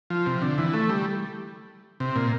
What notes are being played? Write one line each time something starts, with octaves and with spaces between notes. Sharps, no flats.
F3
C3
D3
E3
A3
G3
C3
A#2